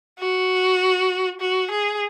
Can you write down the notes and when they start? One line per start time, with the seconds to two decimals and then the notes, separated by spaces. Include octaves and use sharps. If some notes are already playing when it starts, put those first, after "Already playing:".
0.19 F#4
1.41 F#4
1.71 G#4